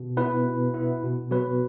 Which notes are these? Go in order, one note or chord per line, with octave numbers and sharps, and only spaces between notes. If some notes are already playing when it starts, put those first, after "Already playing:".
Already playing: B2
B3 E4 B4
B2
B3 E4 B4
B2
F#3 B3 F#4 B4